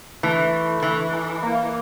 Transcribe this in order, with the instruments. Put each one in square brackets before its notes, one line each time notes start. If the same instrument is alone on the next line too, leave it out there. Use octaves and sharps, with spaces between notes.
[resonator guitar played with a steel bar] E3 [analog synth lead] A3
[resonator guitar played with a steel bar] E3
[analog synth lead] A#3